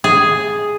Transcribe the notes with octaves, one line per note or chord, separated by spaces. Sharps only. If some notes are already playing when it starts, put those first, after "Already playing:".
G#4